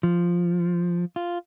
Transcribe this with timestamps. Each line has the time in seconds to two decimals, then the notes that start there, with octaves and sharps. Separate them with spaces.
0.03 F3
1.16 F4